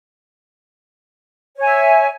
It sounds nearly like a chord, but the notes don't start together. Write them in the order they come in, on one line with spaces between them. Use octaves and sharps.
C#5 G#5 E5